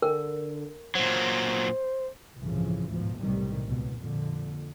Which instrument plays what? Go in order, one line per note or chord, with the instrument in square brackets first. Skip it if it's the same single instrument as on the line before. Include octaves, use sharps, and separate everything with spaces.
[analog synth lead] D3 [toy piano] A#4
[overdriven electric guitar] A#2 F#3 [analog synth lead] C5
[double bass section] G1 C2 A2 C#3 E3 F3
A1 D2 G#2 B2 F3
B1 A2 C3 D#3 G3
C#2 B2
F2 A#2 D3